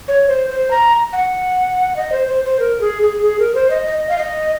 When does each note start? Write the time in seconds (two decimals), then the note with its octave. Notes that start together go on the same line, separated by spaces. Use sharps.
0.08 C#5
0.29 C5
0.50 C5
0.71 A#5
1.13 F#5
1.96 D#5
2.12 C5
2.28 C5
2.45 C5
2.59 A#4
2.81 G#4
3.02 G#4
3.23 G#4
3.39 A#4
3.55 C5
3.70 D#5
3.86 D#5
4.09 F5
4.18 D#5